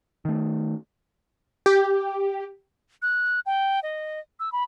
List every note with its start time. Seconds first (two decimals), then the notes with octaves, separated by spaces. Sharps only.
0.25 D#3 A3
1.66 G4
3.02 F#6
3.46 G5
3.83 D#5
4.40 E6
4.52 B5